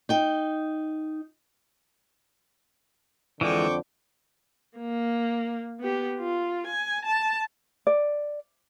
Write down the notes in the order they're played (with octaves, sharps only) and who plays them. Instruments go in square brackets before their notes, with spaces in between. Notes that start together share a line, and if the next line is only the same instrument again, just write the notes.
[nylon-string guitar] D#4 G5
[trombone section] F2 D3 [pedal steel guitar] E3 F3 G#3 [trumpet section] G5 C#6 D6
[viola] A#3
B3 G4
F4
G#5
A5
[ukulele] D5